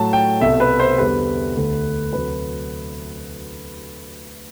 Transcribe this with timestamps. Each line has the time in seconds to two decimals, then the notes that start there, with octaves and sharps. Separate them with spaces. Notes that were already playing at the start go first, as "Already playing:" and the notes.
Already playing: A2 F#3 A3 A5
0.13 G5
0.41 C2 B2 A3 E5
0.60 B4
0.80 C5
0.98 E2 D3 G3 B4
1.56 D2 D3 A3
2.13 D2 C3 F#3 A3 B4